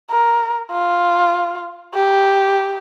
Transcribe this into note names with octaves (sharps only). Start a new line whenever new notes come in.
A#4
F4
G4